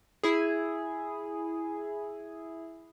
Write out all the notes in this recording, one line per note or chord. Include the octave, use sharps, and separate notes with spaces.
E4 G#4